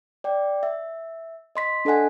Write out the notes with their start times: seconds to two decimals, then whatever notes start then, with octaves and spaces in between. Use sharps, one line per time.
0.24 D5 G5
0.63 E5
1.55 D#5 C6 B6
1.85 D4 A4 D#5 F#5 G#5